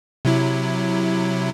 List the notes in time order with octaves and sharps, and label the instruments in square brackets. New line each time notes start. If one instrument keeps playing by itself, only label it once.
[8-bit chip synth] C3 F#3 E4